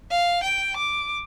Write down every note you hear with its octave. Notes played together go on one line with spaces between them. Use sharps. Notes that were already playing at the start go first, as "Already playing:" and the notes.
F5
G5
D6